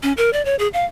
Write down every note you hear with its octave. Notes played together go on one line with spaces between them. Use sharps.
C#4
A#4
D5
C#5
G#4
F5